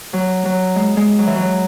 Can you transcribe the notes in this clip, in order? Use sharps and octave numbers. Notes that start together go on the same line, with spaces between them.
F#3
F#3
G#3
G#3
F#3
E3
F#3